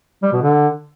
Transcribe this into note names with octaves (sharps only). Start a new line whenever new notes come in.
G3
B2
D3